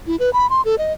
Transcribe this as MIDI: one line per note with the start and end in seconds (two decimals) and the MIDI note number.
0.07 0.16 64
0.20 0.30 71
0.33 0.47 83
0.50 0.62 84
0.65 0.76 69
0.78 0.93 75